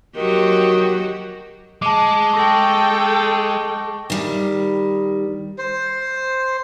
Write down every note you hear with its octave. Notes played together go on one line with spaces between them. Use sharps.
D#3 F#3 F#4 G4
G#3 A5 D6
A4 G5 C#6 A#6
D#3 G3
C5